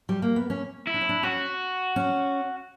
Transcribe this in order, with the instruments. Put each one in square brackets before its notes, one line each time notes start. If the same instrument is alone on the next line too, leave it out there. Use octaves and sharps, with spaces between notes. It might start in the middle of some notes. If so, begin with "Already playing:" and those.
[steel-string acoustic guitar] G3
A#3
B3
C#4
[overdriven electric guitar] E4
[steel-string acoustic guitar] D4
C#4
D4
[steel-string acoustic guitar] C#4 [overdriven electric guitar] F#4
[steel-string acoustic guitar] C#4